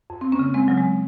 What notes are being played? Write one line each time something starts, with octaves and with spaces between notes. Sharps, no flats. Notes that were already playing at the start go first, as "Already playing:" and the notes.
F2
C4
A#3 C#4
C#3
G#3 C4
C#3 F#3
G#3